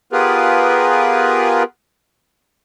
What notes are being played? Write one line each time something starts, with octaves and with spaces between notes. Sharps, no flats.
B3 F4 G4 G#4 A#4 B4